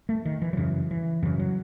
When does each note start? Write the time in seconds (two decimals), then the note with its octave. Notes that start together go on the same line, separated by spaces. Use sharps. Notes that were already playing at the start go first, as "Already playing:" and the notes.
0.09 A3
0.25 D#3
0.42 E3
0.53 F#3
0.57 F#2 C#3 E3
0.91 E3
1.22 F#2 C#3 E3
1.40 F#3